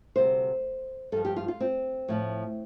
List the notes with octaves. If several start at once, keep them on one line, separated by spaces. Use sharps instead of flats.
D2 C3 G3 C5
G2 F3 A4
G4
F4
F4
C4
A2 F3